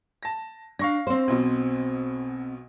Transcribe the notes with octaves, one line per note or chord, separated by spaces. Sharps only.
A5 A#6
D4 F5 C#6 A#6
C4 C5
B1 B2